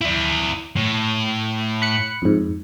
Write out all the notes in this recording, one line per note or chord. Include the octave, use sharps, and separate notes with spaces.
E4 D5
A2
B5 F#6 C#7
F2 G#2